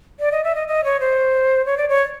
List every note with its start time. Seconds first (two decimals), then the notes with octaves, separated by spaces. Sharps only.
0.20 D5
0.32 D#5
0.44 E5
0.55 D#5
0.68 D#5
0.84 C#5
1.00 C5
1.66 C#5
1.77 D5
1.89 C#5